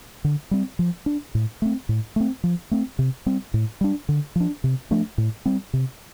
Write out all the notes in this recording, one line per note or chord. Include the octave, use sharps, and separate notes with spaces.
D3
G3 C4
F3
D4
A2
A3 C4
A2
A3 C4
F3
A3 C4
C3
G3 C4
A2
G3 D4
D3
F3 D4
C3
F3 A3 D4
A2
G3 C4
C3